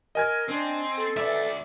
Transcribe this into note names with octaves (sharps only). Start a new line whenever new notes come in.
A#4 D#5 G#5 G#6
C4 D4
A4
D2 D5 E5